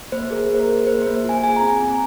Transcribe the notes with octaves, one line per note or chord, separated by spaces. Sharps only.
A#3 C5
G#4 A#4
A#3
C5
A#4
G#4
A#3 C5
C5
A#3
F4 G#5
G#4 G#5
A#5
C4
G#5
C4